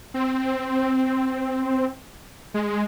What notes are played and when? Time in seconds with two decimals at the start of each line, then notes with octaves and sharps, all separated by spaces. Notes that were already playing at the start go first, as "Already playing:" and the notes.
0.14 C4
2.54 G#3